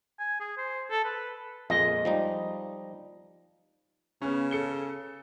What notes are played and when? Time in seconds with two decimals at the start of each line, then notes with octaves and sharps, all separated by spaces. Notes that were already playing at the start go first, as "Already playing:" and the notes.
0.19 G#5
0.40 G#4
0.58 C5
0.90 A4
1.05 B4
1.70 F2 A#2 G#3 D#5
2.05 F3 G3 D#4
4.22 C#3 B3 C#4
4.51 A4 C#7 G7